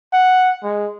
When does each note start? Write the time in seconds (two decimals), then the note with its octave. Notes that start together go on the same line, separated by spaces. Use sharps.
0.13 F#5
0.64 G#3